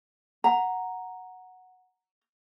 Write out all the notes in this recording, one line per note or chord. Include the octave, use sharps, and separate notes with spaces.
F#5 A#5